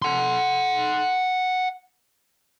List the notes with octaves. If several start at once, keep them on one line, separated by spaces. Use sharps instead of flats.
F#5 C6